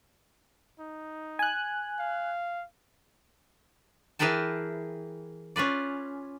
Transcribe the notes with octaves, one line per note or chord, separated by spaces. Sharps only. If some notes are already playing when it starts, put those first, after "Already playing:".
D#4
G#5 F#6
F5
E3 G#4 A#4 B4 G5 A5
C#4 F4 B4 D5